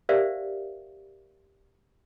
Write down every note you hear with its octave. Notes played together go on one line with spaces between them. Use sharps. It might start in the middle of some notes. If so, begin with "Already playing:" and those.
G4 A#4 C5 D5 E5 F5